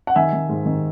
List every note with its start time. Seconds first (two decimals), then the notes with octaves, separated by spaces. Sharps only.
0.07 F#5
0.16 D#3 E5 G#5
0.33 D#3
0.49 G#2
0.66 D#3